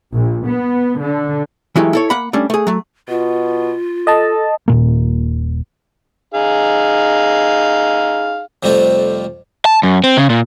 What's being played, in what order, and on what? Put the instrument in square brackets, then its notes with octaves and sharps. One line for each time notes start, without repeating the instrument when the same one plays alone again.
[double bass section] A#1
B3
D3
[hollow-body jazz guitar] E3 F#3 G#3 A3 E4 G4
E4 A4 C#5
A#3 F#5 B5
G3 A3 C#4 D4
A3 G#4
F#3 A3
[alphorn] B2 [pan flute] F4
[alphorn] A4 [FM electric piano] D#5 A5
[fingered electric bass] D#1 A#2 A#3
[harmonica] D#4 G#4 F5
[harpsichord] F2 C3 G3 A3 C4 F4
[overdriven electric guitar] A5
F#2
C4
C#3
A#2